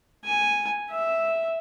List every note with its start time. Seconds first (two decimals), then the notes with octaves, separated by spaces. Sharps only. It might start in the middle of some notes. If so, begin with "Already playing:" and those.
0.25 G#5
0.91 E5